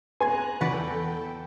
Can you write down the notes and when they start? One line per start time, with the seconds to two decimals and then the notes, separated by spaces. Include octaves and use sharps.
0.20 B4 G#5 A#5 C6 F#6 G#6
0.61 E2 C#3 E3 F#4 A4 B4 D5 G5